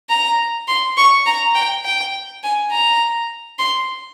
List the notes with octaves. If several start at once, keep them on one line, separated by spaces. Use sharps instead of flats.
A#5
C6
C#6
A#5
G5
G5
G#5
A#5
C6